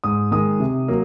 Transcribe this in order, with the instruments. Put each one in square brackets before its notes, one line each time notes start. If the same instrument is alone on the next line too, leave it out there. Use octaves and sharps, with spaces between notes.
[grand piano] G#2 D#6
D#3 G#3 D#6
C3
F#3 A#3